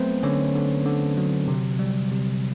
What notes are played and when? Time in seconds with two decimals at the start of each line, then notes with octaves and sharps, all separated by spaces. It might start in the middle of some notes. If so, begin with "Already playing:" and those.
Already playing: F#3 A3 B3 C4 B4 C5
0.23 D3 C#4 C#5
0.55 D3
0.85 D3
1.18 F#3
1.48 C3
1.79 G3
2.11 C3